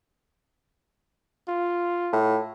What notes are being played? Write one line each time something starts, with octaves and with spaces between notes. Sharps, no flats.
F4
A2